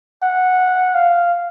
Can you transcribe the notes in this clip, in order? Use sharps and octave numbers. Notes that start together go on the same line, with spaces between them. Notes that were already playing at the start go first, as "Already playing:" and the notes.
F#5
F5